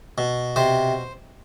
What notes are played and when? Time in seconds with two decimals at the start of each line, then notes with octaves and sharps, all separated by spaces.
0.18 B2
0.56 C3 C5